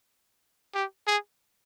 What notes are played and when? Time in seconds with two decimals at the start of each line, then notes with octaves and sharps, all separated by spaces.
0.75 G4
1.07 G#4